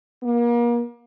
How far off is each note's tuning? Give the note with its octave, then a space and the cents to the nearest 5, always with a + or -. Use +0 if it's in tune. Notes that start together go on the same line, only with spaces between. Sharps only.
A#3 +35